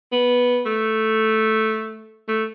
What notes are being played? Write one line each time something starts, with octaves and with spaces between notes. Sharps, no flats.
B3
A3
A3